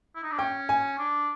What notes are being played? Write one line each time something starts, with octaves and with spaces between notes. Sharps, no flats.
E4
D#4
D4
C#4 G5
G#5
D4